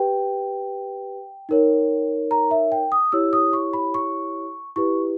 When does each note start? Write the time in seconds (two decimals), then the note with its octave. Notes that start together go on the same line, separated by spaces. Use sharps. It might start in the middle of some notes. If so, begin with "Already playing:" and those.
Already playing: G4 B4 G5
1.49 D#4 A#4 C#5
2.31 A#5
2.51 E5
2.72 G5
2.92 D#6
3.12 E4 G4 C#5 E6
3.33 D#6
3.53 C#6
3.73 B5
3.94 C#6
4.76 E4 G4 B4 C#6